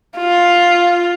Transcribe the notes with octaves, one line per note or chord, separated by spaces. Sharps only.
F4